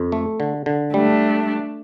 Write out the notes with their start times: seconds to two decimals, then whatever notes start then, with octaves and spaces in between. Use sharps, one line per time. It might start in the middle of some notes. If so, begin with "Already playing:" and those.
Already playing: F2
0.12 A3
0.40 D3
0.66 D3
0.93 G3 A3 D4